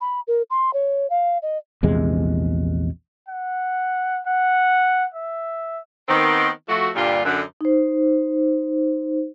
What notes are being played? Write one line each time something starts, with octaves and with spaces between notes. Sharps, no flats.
B5
A#4
C6
C#5
F5
D#5
A#1 E2 C3 G#3
F#5
F#5
E5
D#3 B3 C4
F3 A3 F#4
G2 A#2 D3 G3 D4 F4
F#2 D3
D#4 C5